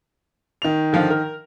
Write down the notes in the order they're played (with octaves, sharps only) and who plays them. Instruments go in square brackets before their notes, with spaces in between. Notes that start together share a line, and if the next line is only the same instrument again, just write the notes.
[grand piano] D#3 F7
[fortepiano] D3 F3 F5
A#4